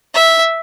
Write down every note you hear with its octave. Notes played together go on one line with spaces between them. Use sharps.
E5